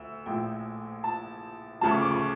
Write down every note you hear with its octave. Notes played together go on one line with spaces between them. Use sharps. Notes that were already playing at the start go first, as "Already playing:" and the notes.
Already playing: D2 E6
A#1 A2 F3 G5
A5
D2 C#3 F3 A5
C#6
D6
C#6